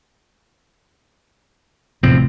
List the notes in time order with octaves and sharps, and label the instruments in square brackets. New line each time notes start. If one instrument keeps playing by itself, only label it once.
[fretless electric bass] D#1 A2 C3 [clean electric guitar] E2 F3 C4